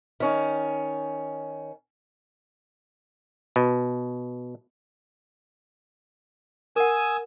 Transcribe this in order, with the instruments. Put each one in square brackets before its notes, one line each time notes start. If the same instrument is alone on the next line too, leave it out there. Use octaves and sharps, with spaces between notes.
[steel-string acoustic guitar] D#3 C#4
[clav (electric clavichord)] B2
[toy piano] A#4 F#5 [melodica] G#5 D#6 E6